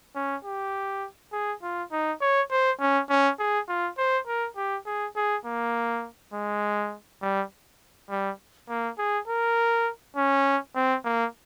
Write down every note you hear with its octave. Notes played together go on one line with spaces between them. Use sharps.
C#4
G4
G#4
F4
D#4
C#5
C5
C#4
C#4
G#4
F4
C5
A#4
G4
G#4
G#4
A#3
G#3
G3
G3
A#3
G#4
A#4
C#4
C4
A#3